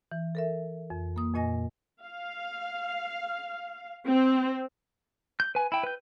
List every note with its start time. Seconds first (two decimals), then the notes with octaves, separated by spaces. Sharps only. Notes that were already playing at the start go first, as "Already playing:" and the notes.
0.11 E3
0.35 A4 A#4 E5
0.90 F2
1.16 A#3 D#6
1.34 F2 A#2 D#5 G#5 A#6
2.04 F5
4.08 C4
5.40 G6
5.55 B4 G#5
5.72 E4 G5
5.83 B4 G6